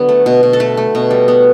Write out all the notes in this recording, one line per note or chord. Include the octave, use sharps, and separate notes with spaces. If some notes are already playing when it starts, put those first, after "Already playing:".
Already playing: D3 F#3 B3
A3
B2
B2
A4
A3 B4
A3
B2
G3
B3